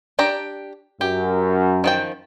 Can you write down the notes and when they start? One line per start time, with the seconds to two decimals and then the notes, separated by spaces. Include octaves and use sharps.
0.19 D4 G4 A#5
1.01 F#2 G4
1.84 D#3 F3 G5